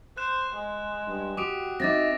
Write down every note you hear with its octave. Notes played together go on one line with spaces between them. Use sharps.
C5 F#6 E7
G#3
G2
F#4 G4 D6 D#6 D7
C4 D#4 E5 D6 A6 A#6